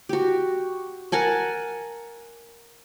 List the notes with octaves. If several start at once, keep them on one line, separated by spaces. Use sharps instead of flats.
F#4 G4
A#4 F#5 G#5 A5